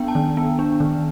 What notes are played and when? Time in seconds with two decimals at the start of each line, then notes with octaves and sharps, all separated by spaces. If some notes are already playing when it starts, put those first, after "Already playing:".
Already playing: B3 D4 G5
0.08 A5
0.15 D#3
0.37 B3
0.59 D4
0.80 D#3